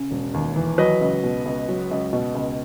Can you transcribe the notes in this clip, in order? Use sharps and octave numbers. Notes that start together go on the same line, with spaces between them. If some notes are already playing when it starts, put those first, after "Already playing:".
Already playing: C#3
E1
D#2
E3
F#3 B4 D#5
C#2
B2
C#2
F#3
C#2
B2
C#2